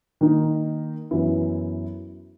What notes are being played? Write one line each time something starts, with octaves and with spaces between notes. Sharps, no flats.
D#3 A#3 D#4
F#2 E3 B3 E4